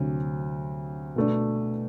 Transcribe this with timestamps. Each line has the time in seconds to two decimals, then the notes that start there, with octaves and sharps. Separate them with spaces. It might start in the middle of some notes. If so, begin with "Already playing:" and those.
Already playing: D2 C3 F#3 C4
1.16 B2 A3 D4